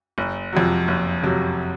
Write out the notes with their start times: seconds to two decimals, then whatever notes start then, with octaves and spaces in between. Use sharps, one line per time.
0.18 F#1
0.53 F2 C3 F#3
0.88 F#1
1.23 F2 C3 F#3